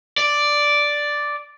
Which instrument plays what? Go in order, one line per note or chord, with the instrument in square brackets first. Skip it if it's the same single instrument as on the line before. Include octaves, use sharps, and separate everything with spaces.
[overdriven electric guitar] D5